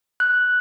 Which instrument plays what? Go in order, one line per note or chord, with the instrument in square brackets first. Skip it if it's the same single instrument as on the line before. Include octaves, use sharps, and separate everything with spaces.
[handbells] F#6